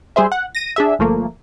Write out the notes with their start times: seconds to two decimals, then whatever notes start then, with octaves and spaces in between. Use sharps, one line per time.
0.16 G3 G#4 C5 E5
0.32 F#5
0.55 A#6 D#7
0.76 D4 G#4 E5
0.99 G1 F3 A3 A#3